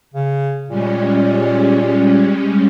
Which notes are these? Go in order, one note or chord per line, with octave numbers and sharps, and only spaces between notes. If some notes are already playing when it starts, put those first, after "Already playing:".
C#3
A#2 G3 G#3 C#4